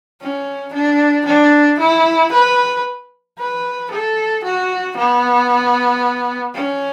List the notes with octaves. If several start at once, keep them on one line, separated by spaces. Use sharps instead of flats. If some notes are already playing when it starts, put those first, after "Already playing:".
C#4
D4
D4
E4
B4
B4
A4
F#4
B3
C#4